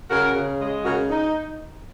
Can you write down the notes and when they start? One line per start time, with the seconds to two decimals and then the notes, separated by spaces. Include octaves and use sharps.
0.10 C#3 F#4 A#4
0.34 C#3
0.60 G#3
0.85 C#3 F#4 A#4
1.10 D#4